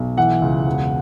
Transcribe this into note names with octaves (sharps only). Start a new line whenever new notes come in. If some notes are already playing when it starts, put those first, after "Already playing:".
Already playing: B1
E3 F#5
C#2
E1